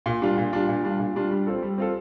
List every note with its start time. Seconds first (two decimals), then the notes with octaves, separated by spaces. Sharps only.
0.06 A#2
0.22 G3 D4 F4
0.38 A#2
0.53 G3 D4 F4
0.69 A#2
0.83 G3 D4 F4
0.99 A#2
1.15 G3 D4 F4
1.31 G3
1.47 C4 F4 A4
1.62 G3
1.78 C4 F4 A4